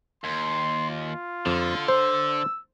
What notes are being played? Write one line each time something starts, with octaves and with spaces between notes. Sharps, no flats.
D#2 C6
F4
F2 D3
C5 E6